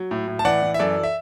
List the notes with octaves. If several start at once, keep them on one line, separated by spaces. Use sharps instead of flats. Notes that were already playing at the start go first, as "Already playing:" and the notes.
Already playing: F#3
A2
A2
A5
E3 D5 F#5
E3
E5
F#2 A4 D5
E5